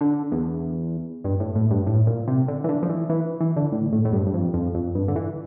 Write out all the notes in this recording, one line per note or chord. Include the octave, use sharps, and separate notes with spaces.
D3
E2
G2
A2
A2
G2
A2
A#2
C3
D3
E3
D3
F3
E3
E3
E3
D3
A2
A2
A2
G2
G2
F2
F2
F2
G2
D3
E3